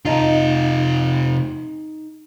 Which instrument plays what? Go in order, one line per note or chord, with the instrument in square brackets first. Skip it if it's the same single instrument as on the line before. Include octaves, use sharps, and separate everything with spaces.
[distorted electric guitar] C3 F4 [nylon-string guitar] D#4 D#5 A5